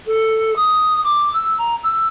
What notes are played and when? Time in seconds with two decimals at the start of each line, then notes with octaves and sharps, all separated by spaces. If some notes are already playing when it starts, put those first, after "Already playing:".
0.07 A4
0.56 D#6
1.04 D6
1.33 E6
1.58 A#5
1.83 E6